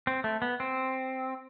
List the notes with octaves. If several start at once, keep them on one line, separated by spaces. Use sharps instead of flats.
C4
A3
B3
C4